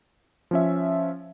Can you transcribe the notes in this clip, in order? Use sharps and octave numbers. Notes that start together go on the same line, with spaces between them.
F3 C#4 E5